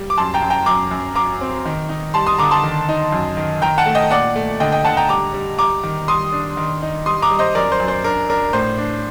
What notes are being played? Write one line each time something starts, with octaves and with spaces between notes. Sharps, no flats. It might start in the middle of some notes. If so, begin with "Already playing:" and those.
Already playing: G3
D6
F#2 A5 C6
G5 A#5
F#2
G5 A#5
F#2 A#5 D6
F#2
F#3 A#5 D6
C4
D#3
D#4
G3 A5 C6
C6 D#6
D3 A#5 D6
A5 C6
D#3
D#4
F#2
D#3
D#3 G5 A#5
F#5 A5
A3
D#5 G5
A#2 D5 F#5
A3
D3 D#5 G5
D#5 G5
D3 F#5 A5
G5 A#5
G3 A#5 D6
G3
G3 A#5 D6
D#3
G3 C6 D#6
D4
D#3
D#4
G3 C6 D#6
A#5 D6
G3
C5 D#5
F#2 A#4 D5
C5
F#2
C5
D4 A#4
D4 A#4
A2 C5
D4